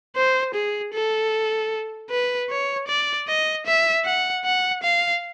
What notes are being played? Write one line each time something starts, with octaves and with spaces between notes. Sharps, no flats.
C5
G#4
A4
B4
C#5
D5
D#5
E5
F#5
F#5
F5